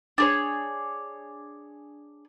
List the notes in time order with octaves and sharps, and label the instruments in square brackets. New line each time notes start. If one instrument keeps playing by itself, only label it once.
[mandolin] D4 G#4 C#5